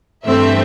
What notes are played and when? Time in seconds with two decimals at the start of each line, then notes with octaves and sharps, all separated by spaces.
0.25 G2 E3 A3 C4 E5